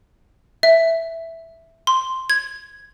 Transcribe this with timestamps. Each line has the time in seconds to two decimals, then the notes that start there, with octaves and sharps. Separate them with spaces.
0.63 E5
1.87 C6
2.30 G#6